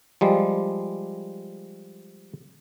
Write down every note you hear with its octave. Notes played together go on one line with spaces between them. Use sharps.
F3 G3 G#3